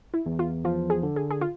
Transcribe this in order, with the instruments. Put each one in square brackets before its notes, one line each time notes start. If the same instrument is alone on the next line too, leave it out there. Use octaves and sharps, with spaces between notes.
[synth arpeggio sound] E4
[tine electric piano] E2
[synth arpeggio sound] F4
[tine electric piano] F3 [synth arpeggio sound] F4
[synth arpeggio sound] G#4
[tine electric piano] D3
[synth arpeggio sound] G#4
G#4
F4